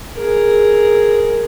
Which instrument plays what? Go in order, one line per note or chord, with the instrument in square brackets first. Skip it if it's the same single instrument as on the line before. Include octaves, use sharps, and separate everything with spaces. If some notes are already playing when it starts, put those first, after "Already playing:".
[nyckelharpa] G#4 A#4